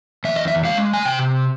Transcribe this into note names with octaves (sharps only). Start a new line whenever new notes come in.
E2 E5
D#5
E5
G#3 F5
G#5
C3 G5